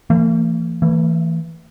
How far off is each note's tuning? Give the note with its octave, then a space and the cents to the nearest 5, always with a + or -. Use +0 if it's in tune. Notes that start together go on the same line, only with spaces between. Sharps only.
E3 +35 A#3 -45
E3 +0 A3 +45